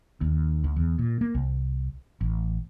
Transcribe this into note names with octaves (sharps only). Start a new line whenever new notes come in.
D#2
D2
E2
A#2
A#3
C2
A1